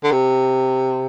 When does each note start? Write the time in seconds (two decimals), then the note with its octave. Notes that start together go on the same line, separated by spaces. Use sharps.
0.04 D3
0.12 C3